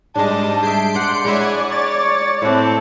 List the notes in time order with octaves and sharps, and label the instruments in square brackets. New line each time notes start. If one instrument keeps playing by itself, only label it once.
[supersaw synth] G#2 G3 D#5 [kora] G#3 D4 [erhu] A5
[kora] G#4 E5 [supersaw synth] G6 C7 D7
[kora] D5 F#5 [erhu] C6
[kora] G#3 E4 E5 [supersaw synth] C#5 F#5 G#5 [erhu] D5
[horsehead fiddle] C#5 [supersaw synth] A6
[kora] A2 F#5 [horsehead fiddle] C4 A5 [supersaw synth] E4